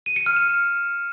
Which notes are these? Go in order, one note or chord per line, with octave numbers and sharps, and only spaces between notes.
D#7
C#7
F6
E7